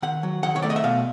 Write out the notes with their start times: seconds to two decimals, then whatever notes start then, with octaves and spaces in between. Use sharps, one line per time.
0.02 D#3 F#5
0.23 F#3
0.43 D#3 F#5
0.56 C#5
0.62 A3 D5
0.70 D#5
0.76 E5
0.84 B2 F5